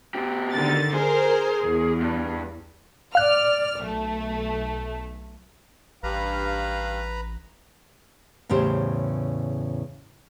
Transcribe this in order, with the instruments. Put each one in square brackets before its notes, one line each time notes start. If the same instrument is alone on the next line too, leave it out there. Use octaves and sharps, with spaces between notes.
[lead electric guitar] B2 G4
[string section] D3 D#3 A6
[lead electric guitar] G#4 [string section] A#4 C5
[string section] E2
[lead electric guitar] G2
[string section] D5 F6 [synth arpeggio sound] F5 F#6
[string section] B1 A3
[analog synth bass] A1 [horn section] G2 F5 [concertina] B4 A#5 B5
[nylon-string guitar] E2 A2 C#3 G4 C5